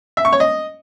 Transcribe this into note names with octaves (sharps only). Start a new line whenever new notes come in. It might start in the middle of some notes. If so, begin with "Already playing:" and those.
E5
C#6
C#5
D#5